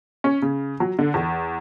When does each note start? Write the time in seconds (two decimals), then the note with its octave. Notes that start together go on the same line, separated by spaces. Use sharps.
0.24 C#4
0.42 C#3
0.80 F#3
0.99 D3
1.14 E2